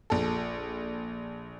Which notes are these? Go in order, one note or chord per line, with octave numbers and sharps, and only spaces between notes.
A#1 A4